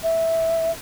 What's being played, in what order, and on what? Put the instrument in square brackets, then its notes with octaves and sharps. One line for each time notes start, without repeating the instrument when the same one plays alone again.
[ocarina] E5